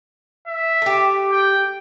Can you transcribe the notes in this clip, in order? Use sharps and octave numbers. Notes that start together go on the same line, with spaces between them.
E5
A3 G4
G5